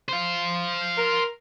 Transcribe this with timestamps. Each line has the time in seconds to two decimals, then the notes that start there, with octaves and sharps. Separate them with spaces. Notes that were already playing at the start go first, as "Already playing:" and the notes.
0.09 C5 F5
0.98 A#4